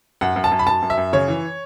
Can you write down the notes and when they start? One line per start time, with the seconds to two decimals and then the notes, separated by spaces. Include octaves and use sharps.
0.21 F#2 F#5
0.36 F#2
0.44 A5
0.52 F#2
0.59 B5
0.67 F#2 A5
0.82 F#2
0.90 E5
0.97 F#2
1.13 C#3 C#5
1.28 E3